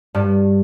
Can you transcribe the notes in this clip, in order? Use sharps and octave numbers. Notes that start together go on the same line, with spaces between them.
G2